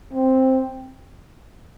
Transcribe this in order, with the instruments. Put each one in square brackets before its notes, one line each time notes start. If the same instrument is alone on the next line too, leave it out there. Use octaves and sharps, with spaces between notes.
[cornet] C4